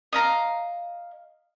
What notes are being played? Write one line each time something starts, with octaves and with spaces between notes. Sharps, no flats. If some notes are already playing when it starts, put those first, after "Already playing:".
D#5 F5 A#5